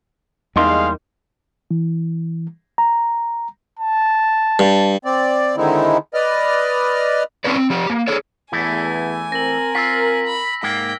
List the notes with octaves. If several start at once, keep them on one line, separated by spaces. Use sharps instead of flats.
E2 G3 G#3 A#3 D#4 F5 C6
E3
A#5
A5
G2
C4 D5
D3 D#3 G#3 C4 D#4 E4
B4 D5 D#5 F6
C4 C#4 E4 B4 D5
C4
F3 G4
A#3
G#4 A4 C#5
E2 E3 A3 E4 G#5
C4 A#4 A#6 F#7
F4 E6 B6
B5
G#2 A#3 G5